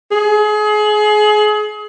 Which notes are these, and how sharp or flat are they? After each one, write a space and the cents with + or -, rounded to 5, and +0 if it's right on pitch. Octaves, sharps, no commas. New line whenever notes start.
G#4 +30